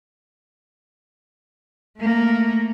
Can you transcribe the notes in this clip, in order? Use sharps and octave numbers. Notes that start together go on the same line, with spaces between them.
A3 A#3